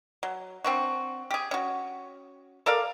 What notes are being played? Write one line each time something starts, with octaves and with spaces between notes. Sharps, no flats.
F#3
C4 D4 F#4
G4 G#4
C#4 F#4
A4 A#4 D5 F5